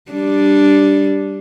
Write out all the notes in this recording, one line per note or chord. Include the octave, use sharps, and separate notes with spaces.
G3 D4